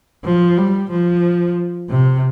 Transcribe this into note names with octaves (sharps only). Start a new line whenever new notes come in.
F3
G3
F3
C3